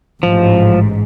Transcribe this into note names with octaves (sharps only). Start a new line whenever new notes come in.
A1 G#2 F3